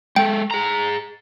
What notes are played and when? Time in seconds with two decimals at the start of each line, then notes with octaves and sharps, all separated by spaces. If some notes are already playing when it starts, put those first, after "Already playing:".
0.16 G#3 A4 G5
0.51 G#4 A#5